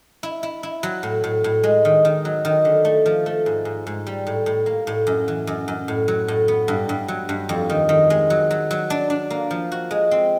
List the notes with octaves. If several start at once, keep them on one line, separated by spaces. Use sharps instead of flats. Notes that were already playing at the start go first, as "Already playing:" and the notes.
E4
E4
E4
F#3
A2
A2
A2
G#3
D#3
D#3
F#3
D#3
D3
A3
F3
A3
G#2
G#2
G#2
G3
A2
A2
A#3
A2
F#2
E3
F#2
F#2
A2
F#3
A2
B3
G2
G2
F#3
G2
F2
D#3
D#3
G#3
F#3
F#3
F#3
D4
D4
A#3
F3
F#4
G#3
C4